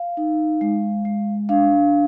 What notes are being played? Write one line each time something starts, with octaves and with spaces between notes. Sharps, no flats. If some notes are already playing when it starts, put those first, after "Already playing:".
Already playing: F5
D#4
G#3
G#3
D4 F5